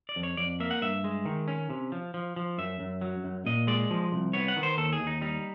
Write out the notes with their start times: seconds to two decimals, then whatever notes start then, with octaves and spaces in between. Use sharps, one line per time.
0.09 D5
0.16 F2
0.23 C#5
0.37 F2 D5
0.60 A#3 E5
0.71 F#5
0.82 G2 E5
1.04 G#3
1.25 D#3
1.48 C#4
1.70 C3
1.92 F3
2.14 F3
2.36 F3
2.58 F#2 E5
2.80 F#2
3.01 F#3
3.24 F#2
3.46 A#2 D#5
3.67 G#3 D5
3.90 F3
4.12 C2
4.33 B3 C#5
4.48 F#5
4.56 D#3
4.63 C5
4.78 D#2 A4
4.93 G#4
5.00 D#2
5.07 D#4
5.21 G3 D#4